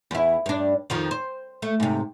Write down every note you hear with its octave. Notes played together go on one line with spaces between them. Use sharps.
E2 E4
G2 D4
F2 D#3 F3
C5
A3
G#2 C3